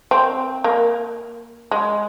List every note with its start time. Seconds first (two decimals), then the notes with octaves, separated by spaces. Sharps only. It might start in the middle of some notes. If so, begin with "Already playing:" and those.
0.11 C4
0.64 A#3
1.71 G#3